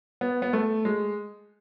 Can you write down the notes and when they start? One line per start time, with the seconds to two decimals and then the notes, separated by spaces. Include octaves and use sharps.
0.21 B3
0.42 B3
0.53 A3
0.85 G#3